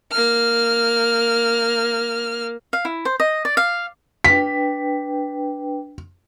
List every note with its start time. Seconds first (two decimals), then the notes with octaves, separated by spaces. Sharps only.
0.12 A#3 F6
2.73 F5
2.85 E4
3.05 C5
3.20 D#5
3.45 D5
3.57 F5
4.24 D4 B4 G5 B6